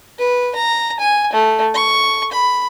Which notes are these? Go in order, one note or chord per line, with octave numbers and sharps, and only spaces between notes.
B4
A#5
G#5
A3
C#6
B5